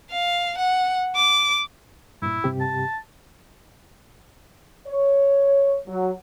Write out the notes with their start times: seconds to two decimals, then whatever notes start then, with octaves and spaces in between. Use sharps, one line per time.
0.12 F5
0.58 F#5
1.16 D6
2.22 G2 A#2 E4
2.44 G2 C3 G4
2.60 A5
4.88 C#5
5.88 F#3